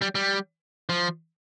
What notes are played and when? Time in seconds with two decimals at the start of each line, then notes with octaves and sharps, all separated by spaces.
0.02 G3
0.15 G3
0.89 F3